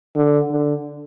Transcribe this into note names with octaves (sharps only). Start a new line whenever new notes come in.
D3
D3